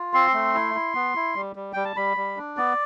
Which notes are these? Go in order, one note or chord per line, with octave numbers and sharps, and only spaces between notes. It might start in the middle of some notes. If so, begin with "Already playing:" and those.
Already playing: F4
C4 C6
A3
E4
E4
B3
E4
G3
G3
G3 G5
A5
G3 B5
G3
D4
B3 D5